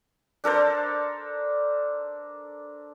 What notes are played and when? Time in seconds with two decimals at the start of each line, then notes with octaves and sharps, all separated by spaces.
0.44 D4 A4 A#4 C5